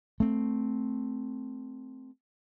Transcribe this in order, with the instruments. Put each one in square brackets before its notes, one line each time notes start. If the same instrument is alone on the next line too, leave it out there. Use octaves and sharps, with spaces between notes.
[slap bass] A3 C4